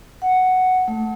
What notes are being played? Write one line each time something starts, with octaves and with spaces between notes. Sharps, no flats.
F#5
A3